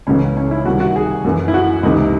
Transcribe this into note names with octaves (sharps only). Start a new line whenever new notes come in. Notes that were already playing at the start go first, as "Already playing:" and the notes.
C#2 C#3 E3 C#4
C#4
E4
C2 C3 D#3 F#4
F#4
G#4
F#2 E3
E4
F#4
C#2 C3 E3 D#4